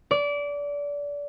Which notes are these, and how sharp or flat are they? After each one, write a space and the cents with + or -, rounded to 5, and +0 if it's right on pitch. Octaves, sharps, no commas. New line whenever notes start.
D5 -25